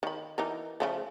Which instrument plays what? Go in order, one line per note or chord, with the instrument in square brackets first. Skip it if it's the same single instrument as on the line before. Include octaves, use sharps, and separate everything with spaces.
[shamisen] D#3 B5
E3 D#4 A#4
C#3 F3 A3